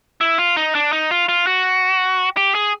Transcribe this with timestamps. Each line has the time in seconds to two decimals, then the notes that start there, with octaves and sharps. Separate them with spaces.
0.21 E4
0.38 F4
0.56 D#4
0.75 D4
0.93 D#4
1.11 F4
1.29 F4
1.47 F#4
2.37 G4
2.55 G#4